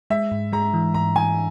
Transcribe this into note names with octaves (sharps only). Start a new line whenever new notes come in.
G#3 E5
G#2
G#3 A#5
E3
G#2 A#5
E3 G#5